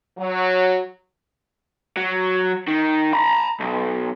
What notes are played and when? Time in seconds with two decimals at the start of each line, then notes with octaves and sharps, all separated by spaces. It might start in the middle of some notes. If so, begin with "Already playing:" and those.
0.18 F#3
1.97 F#3
2.68 D#3
3.13 A#5 B5
3.60 B1